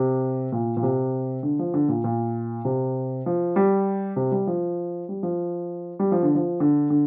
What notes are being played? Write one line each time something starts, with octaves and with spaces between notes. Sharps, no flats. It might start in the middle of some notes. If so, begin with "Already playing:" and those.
Already playing: C3
A#2
A#2
C3
D3
F3
D3
A#2
A#2
C3
F3
G3
C3
G3
F3
G3
F3
G3
F3
D3
F3
D3
D3